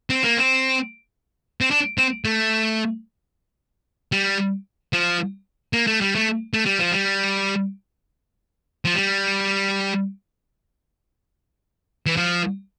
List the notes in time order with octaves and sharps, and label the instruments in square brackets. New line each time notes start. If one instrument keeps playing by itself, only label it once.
[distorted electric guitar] C4
A#3
C4
C4
D4
C4
A3
G3
F3
A#3
A3
G3
A3
A3
G3
F3
G3
F3
G3
E3
F3